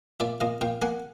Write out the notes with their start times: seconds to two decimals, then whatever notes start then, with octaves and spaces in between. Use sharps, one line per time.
0.20 A#2 D5 E5
0.40 A#2 D#5 F5
0.61 A#2 F5 G5
0.82 A#3 F#5 G#5